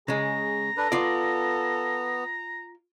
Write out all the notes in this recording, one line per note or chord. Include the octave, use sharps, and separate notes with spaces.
C#3 G#3 G#4 A#5
D4 A4 B4
B3 F4 D5